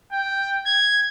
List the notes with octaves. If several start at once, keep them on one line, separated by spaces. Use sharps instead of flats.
G5
G#6